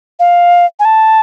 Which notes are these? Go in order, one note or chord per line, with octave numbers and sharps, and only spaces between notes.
F5
G#5
A5